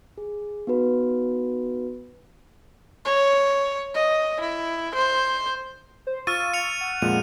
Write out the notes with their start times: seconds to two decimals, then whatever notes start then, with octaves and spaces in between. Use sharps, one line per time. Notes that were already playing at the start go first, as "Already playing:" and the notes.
0.18 G#4
0.67 B3 D#4 F#4 B4
3.05 C#5
3.95 D#5
4.40 E4
4.95 C5
6.07 C5
6.27 F4 C#6 E6 F6 A6 D#7
6.54 C#7 F7
6.81 F#5
7.02 F2 A#2 G#3 D#7